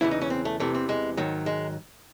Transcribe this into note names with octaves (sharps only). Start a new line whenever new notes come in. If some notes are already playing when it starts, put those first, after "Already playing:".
E2 C#3 E3 E4
D#4
C#4
C4
A3
E2 C3 E3 A3
C4
G#3
G#2 D#3 F#3
G#3